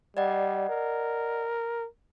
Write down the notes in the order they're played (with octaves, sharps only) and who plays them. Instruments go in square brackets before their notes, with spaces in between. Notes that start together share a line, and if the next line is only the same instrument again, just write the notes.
[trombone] G3 [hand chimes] D5 D#5 F#5
[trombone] A#4